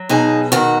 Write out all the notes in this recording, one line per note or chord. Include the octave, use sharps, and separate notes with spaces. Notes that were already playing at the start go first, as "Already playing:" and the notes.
Already playing: F#3
B2 D#4 G#4
D#3 F#4